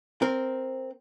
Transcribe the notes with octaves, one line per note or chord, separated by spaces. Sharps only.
C4 A#4